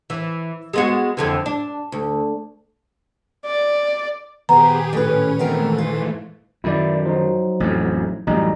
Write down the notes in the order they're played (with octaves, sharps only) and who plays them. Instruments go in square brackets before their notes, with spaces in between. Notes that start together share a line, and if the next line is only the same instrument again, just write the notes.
[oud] E3
G#3 B3 F#4
F2 D3 E3
D4
D2
[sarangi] D5
[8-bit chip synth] A#2 D#3 [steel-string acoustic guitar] B3 C5 [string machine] G4 G#4 [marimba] A#5
[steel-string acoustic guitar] A2 B4 [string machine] C#4
[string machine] G#2 E3 A3 [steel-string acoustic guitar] B3 C4 A#4
[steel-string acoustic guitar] F4
[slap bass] F#2 D#3 [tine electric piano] E4 D5
[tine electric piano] F3 F#3 D#4
[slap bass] A1 F2
[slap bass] A1 F#2 [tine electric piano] G3 D#4